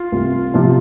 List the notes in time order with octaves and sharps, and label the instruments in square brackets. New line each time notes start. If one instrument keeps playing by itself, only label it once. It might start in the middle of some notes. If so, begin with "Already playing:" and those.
Already playing: [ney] F4
[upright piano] C2
C3 F3 C4